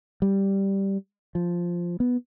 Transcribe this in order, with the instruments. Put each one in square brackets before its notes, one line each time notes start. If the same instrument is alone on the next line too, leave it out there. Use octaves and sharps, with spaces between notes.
[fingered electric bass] G3
F3
B3